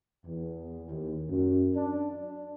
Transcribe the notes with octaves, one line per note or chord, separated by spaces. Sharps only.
E2
D#2
F#2
D4
D4